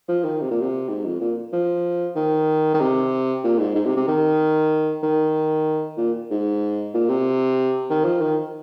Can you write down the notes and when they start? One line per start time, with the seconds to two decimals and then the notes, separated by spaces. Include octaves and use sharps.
0.09 F3
0.25 D#3
0.41 C3
0.51 A#2
0.61 C3
0.89 G#2
1.05 F2
1.21 A#2
1.53 F3
2.16 D#3
2.74 D#3
2.80 C3
3.44 A#2
3.59 G#2
3.76 G#2
3.86 C3
3.97 C3
4.07 D#3
5.03 D#3
5.98 A#2
6.31 G#2
6.94 A#2
7.09 C3
7.90 D#3
8.05 F3
8.21 D#3